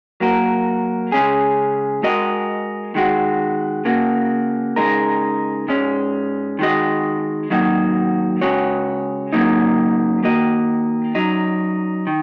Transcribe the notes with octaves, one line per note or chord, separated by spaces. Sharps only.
F#3 A#3 F#4 A#4
C#3 G#3 C#4 G#4
G#3 F#4 A#4 D#5
D#3 G#3 F#4
C#3 A#3 F#4
C#3 G#3 D#4 A#4
G#2 G#3 C#4
D#3 G#3 F#4 D#5
D#3 F#3 A#3 D#4 F#4
C#3 G#3 F#4 C#5
C#3 F#3 A#3 D#4
D#3 A#3 F#4 D#5
F#2 F#3 D#4
D#3